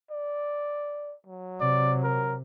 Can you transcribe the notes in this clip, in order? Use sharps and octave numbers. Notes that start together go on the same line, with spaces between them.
D5
F#3
C3 D5
A#4